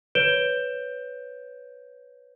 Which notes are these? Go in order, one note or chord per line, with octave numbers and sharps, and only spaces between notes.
B4 C#5 G6 D7 E7 G7